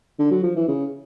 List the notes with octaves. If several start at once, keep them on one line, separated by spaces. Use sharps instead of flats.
D3
F#3
F3
E3
C#3